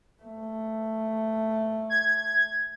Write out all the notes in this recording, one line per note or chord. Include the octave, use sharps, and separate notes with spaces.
A3
G#6